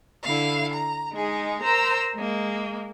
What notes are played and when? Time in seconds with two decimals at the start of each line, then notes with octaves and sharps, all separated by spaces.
0.23 D3 E4 F5
0.73 A#5
1.15 G#3 D#4 G#4
1.63 A#4 C5 A#5 E6
2.16 G#3 A#3